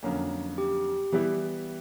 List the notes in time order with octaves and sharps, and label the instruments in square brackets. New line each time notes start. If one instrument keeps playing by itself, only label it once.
[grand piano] F2 D3 F#3 A#3 C#4
[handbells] G4
[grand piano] E3 G3 B3 E4